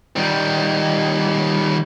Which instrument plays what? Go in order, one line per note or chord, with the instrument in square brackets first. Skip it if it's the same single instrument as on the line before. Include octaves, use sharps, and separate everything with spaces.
[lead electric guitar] D#3 G3